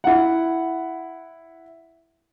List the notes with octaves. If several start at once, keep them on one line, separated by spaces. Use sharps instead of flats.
E4 F#5